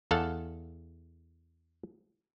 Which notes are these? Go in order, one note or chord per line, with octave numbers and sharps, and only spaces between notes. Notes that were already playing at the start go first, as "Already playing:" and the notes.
E2 A4 F5 F#5 A5